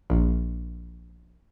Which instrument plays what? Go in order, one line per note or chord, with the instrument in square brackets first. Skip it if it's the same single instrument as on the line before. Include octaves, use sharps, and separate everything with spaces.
[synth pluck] A#1